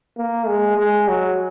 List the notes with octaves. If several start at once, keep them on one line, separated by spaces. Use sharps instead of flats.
A#3
G#3
G#3
F#3